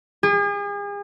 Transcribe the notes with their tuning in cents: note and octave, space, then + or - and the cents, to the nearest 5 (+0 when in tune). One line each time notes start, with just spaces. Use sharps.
G#4 -40